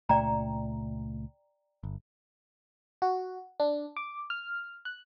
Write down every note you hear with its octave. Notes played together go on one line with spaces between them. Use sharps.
C#2 A#2 A3 D5 G5 A#5
G1
F#4
D4
D6
F6
F#6